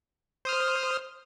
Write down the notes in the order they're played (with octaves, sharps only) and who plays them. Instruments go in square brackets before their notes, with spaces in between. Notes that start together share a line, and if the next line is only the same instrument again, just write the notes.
[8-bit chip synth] C5 D#6 F6